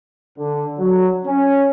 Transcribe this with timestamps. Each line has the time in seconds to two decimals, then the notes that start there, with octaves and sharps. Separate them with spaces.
0.38 D3
0.77 F#3
1.25 C#4